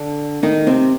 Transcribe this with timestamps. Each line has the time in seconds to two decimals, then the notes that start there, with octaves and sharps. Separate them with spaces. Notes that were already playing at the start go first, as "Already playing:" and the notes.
Already playing: D3 D4
0.43 D#3 D#4
0.67 C3 C4